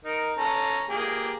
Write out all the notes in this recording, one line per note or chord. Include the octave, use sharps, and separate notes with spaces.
D#4 A#4
C#4 A4 A#5
A#3 G4 G#4